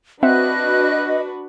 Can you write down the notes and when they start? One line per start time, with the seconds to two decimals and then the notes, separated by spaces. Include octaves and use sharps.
0.23 C4 D4 F#4 B4 D#5 E5 F#5 F#6